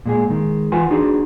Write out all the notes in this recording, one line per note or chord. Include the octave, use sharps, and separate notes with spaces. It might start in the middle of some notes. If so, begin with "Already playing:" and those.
A#2 G#3 G#4
D#3 G#3
E3 F4 B4 F#5 G#5 C6
D4 D#4 F#4 G#4 C6